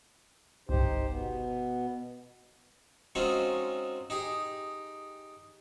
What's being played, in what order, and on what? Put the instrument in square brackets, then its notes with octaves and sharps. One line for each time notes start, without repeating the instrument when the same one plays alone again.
[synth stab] G1 C2 [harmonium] D#4 G4 C5
[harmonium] B2 B3
[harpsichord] F#3 G#3 C4 C#4 D#4 F4
D#4 G4 G#4